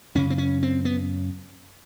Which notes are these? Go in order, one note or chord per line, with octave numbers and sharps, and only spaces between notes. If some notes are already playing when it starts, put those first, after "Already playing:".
F#2 C#3 C#4
C4
C#4
C4
B3